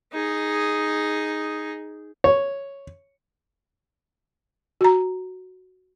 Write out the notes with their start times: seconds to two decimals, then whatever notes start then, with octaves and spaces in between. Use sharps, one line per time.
0.13 D#4 G#4
2.24 C#5
4.81 F#4 A#5